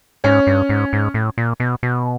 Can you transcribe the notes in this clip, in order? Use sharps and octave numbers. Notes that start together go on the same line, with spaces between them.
G#2 C#4 C#5
G2
G#2
G#2
A2
A#2
B2
B2